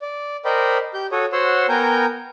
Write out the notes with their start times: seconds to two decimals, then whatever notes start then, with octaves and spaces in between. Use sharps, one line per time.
0.02 D5
0.45 A#4 C5 D5 D#5 G5 B5
0.94 G4 G6
1.12 F#4 A4 C#5 D#6
1.32 F#4 C5 C#5 F#5 C6 E6
1.69 B3 A#4 G5 G#5 A#5 G6